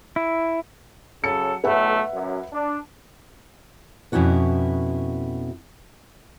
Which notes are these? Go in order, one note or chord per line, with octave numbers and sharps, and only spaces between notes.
E4
C#3 F#3 A4 C#7
B1 A2 A3 B4 E5 F#5
F#2
D4
F2 B2 C#4 E4 F#4 B4